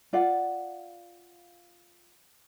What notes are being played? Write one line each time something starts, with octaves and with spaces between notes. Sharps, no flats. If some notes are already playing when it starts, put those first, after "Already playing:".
F4 D5 F5 F#5